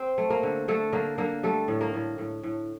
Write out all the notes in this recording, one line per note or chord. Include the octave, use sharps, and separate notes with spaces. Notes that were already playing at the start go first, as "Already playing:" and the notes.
Already playing: C4 C5
A3
A#3 A#4
D3
D3 A3 A4
D3 A#3 A#4
D3 A#3 A#4
G3 A3 A4
A2
A#3 A#4
A2
A2
A2